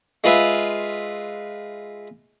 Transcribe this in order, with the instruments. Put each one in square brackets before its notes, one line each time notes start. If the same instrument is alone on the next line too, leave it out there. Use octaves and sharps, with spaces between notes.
[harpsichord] G#3 F4 B4 E5